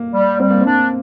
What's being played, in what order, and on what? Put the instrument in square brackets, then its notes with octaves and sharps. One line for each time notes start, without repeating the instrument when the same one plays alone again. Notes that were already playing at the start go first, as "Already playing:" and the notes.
Already playing: [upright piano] A#3
[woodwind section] G3
[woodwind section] G3 [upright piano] C4
[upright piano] A#3
[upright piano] C4 [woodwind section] D4